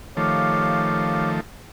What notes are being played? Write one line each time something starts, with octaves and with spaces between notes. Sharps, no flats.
D#3 F3 A3 G4 C#5 F5